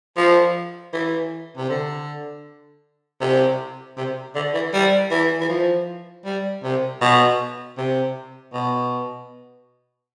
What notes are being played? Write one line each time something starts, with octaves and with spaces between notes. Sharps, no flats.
F3
E3
C3
D3
C3
C3
D3
E3
G3
E3
E3
F3
G3
C3
B2
C3
B2